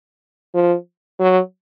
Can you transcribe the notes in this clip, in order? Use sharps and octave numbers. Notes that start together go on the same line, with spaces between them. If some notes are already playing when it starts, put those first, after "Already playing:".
F3
F#3